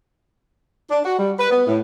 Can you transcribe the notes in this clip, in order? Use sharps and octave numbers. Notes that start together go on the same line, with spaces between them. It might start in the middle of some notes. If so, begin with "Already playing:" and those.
D4
F#4
G3
B4
B3
A2